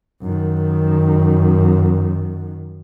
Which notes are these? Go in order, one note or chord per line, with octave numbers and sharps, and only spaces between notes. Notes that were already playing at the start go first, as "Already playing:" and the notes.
F#2 D#3